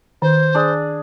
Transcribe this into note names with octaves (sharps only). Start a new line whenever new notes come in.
D#3 C5
D4 G#4